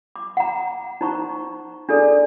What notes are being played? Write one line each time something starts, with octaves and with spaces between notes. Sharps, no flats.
D6
F#5 A#5
D#4 C5 A#5 C#6
D4 G#4 A4 D5